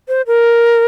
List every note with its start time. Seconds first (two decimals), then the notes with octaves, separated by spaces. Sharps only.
0.08 C5
0.27 A#4